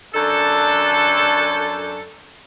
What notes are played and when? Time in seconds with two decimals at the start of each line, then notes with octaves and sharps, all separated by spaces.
0.14 F#2 D4 A4